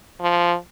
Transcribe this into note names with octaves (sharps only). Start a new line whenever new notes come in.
F3